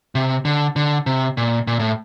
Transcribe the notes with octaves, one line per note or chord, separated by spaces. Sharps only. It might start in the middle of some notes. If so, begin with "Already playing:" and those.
C3
D3
D3
C3
A#2
A#2
A2